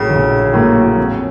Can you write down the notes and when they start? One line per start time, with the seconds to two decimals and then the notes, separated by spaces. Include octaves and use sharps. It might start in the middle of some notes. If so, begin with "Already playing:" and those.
Already playing: A#1 A2 C#3 F#3 A#3
0.10 A#1
0.53 A2 F#3 A#3
0.97 F2